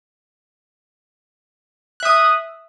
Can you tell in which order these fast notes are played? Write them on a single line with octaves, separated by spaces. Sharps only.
F#6 E5 D#6